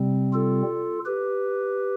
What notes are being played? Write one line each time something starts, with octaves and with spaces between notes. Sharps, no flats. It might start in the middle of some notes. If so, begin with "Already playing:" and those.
Already playing: C3 G3 C4
F4 A4
G4 B4